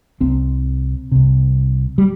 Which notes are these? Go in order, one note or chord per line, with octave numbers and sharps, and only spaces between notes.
C2 C3 C4
C2 C3
G3